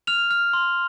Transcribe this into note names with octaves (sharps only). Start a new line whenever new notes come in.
F6 F7
F6
C6